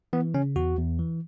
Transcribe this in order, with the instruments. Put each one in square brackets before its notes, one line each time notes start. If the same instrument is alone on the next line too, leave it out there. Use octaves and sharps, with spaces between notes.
[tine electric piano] E3 B3
C#3 C#4
E2 F#4
E2
E3